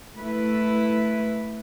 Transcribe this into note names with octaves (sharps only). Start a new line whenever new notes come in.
A3 E4 B4